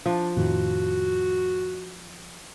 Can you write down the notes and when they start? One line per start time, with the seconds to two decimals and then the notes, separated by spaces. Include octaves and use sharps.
0.06 F3 D4
0.36 F2 A2 D#3 F#4